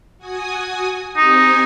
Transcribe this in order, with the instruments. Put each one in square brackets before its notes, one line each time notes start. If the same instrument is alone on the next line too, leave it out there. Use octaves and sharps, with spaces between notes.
[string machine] F#4 G#5 D#6
[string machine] C4 G4 G#5 [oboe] D#4